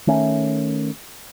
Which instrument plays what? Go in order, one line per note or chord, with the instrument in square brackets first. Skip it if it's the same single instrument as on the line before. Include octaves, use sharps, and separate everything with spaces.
[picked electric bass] D#3 A3 C#4